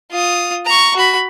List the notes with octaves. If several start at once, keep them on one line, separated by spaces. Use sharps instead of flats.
F4 D#6
A#5 C#6
F#4 B5